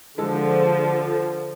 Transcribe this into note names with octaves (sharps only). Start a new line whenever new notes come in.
D3 F3 G#3 A4